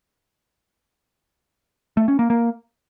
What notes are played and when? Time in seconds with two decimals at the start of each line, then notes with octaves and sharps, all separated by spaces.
1.97 A3
2.08 C#4
2.19 A#3
2.30 A#3